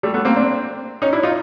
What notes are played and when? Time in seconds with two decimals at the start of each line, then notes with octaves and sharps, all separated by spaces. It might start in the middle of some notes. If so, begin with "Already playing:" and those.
0.03 G3 A3
0.14 A3 B3
0.25 A#3 C4
0.36 C4 D4
1.02 C#4 D#4
1.13 D4 E4
1.23 D#4 F4